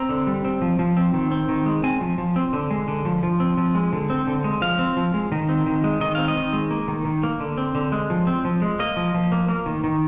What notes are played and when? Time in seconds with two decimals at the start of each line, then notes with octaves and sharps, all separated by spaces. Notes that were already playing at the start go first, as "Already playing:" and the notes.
Already playing: C4 A#5
0.09 D3
0.27 G3
0.45 C4
0.62 F3
0.79 F3
0.97 C4
1.14 D#3
1.31 C4
1.49 D#3
1.66 G#3
1.83 C4 G#5
2.01 F3
2.18 F3
2.36 C4
2.53 D3
2.71 G#3
2.88 D3
3.05 F3
3.23 F3
3.40 C4
3.57 F3
3.75 G#3
3.93 D3
4.10 C4
4.27 D3
4.44 G#3
4.62 F3 F5
4.79 C4
4.97 F3
5.14 G#3
5.32 D#3
5.49 C4
5.66 D#3
5.84 G#3
6.01 D#3 D#5
6.15 C4 F5
6.28 D#5
6.36 D#3
6.53 G#3
6.71 A#3
6.88 D#3
7.05 D#3
7.23 A#3
7.40 D3
7.58 C4
7.75 D3
7.92 G#3
8.10 F3
8.27 C4
8.45 F3
8.62 G#3
8.79 A#3 D#5
8.97 F3
9.14 F3
9.32 A#3
9.49 A#3
9.66 D#3
9.84 D#3